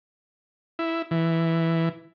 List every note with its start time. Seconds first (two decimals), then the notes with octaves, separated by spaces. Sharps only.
0.79 E4
1.11 E3